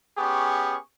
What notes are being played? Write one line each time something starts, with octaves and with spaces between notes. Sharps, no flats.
B3 C#4 G4 G#4 C#6